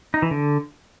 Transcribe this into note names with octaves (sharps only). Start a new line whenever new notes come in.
D#4
E3
D3